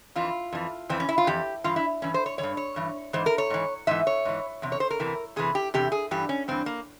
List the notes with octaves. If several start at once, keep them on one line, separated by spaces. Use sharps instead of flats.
F2 E3 F4
F2 E3
F2 E3 C4
C#4
E4
F4
F2 E3 G4
G2 E3 F4
E4
G2 E3 C#4
C5
C#5
E3 C#5
G2
C#5
G2 E3
G#2 E3 C5
A#4
C#5
G#2 E3
G#2 E3 E5
C#5
G#2 E3
E2 C3
C#5
C5
A#4
E2 C3 E3
E2 C3 E3 G#4
G4
E2 C3 G4
G#4
G2 E3 G4
C#4
G2 E3 C4
A#3